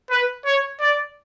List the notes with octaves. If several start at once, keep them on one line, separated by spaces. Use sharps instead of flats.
B4
C#5
D5